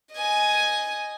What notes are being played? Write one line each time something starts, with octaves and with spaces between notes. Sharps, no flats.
D#5 G#5